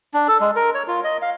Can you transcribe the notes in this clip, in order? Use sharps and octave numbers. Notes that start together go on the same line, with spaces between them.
D4
A4
G#3
A#4
C#5
F4
D#5
F5